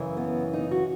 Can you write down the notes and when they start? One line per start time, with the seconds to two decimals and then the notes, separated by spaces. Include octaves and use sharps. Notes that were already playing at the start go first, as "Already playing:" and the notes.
Already playing: F#2 C#3 E3
0.17 B3
0.53 D#4
0.71 F#4